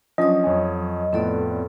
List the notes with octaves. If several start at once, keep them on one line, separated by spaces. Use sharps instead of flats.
F3 F#3 C#4 D4 D#5 D#6
F2 C#5 G#5
F2 A2 B3 C4 A4 D5